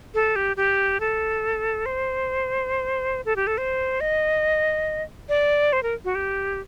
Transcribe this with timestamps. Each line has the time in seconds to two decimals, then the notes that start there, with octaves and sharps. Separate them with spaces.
0.14 A4
0.36 G4
0.57 G4
1.00 A4
1.86 C5
3.25 A4
3.36 G4
3.47 A4
3.58 C5
4.01 D#5
5.29 D5
5.73 C5
5.83 A#4
6.05 F#4
6.15 G4